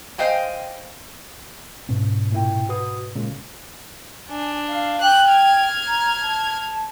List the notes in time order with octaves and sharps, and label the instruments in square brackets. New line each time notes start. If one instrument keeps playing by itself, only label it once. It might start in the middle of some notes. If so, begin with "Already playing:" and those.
[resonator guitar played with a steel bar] C5 D#5 F5 G5 G#5
[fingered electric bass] G#2 B2 C#4
[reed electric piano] A#2 E4 G5
F#4 B4 D#6
A#2 C#3 G#3
[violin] D4 [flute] G#5
[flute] F5
[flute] G5 [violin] F#6 G6
[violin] F6 G#6
[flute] A#5
A5